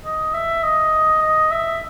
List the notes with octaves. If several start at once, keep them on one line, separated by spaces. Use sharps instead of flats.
D#5
E5
D#5
D#5
E5